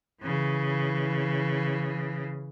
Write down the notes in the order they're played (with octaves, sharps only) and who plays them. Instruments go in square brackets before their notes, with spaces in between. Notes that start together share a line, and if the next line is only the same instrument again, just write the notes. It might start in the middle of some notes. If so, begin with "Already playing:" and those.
[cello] C#3 E3